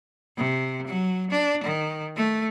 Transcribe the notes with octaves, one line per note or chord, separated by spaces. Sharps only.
C3
F#3
D4
D#3
A3